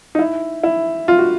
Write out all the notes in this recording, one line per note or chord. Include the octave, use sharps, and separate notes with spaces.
D#4
E4
E4
F4
F#4